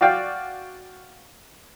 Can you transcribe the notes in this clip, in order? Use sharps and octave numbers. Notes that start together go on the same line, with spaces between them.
F#4 D5 F5 G5